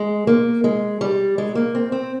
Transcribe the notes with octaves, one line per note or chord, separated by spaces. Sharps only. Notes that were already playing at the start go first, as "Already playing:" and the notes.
Already playing: G#3
A#3
G#3
G3
G#3
A#3
C4
C4